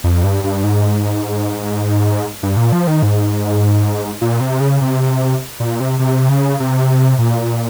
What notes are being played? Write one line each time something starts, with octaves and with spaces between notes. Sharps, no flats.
F2
G2
G2
G#2
G2
A#2
F3
D#3
G#2
A#2
C3
C#3
C3
A#2
C3
C3
C#3
C3
A#2